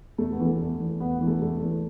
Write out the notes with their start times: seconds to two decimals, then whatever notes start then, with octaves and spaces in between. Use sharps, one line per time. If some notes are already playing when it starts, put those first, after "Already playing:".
0.18 E2 A3
0.32 B3
0.39 E3
0.46 A3
0.60 E2
0.80 E3
1.00 E2 B3
1.21 E3
1.27 A3
1.41 E2 A3
1.62 E3